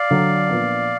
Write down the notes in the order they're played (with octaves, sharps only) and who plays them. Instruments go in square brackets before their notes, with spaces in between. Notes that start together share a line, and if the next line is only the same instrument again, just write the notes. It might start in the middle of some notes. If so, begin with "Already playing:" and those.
Already playing: [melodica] D5 F5
[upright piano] D3 F#3 D4
A#2 F3 B3 D4